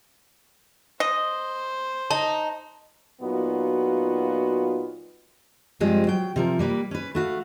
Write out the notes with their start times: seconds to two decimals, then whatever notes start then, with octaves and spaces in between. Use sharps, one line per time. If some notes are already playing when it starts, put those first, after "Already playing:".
1.00 C5 D#5
2.11 D#4 A5
3.21 A#2 F#3 B3 D#4 F4 F#4
5.80 G2 F3 G3 G#3 C4
6.07 F#3 G5
6.36 C3 F3 A#4
6.59 G3 A#3 B4
6.91 C#4 B4
7.15 A3 F#4 F5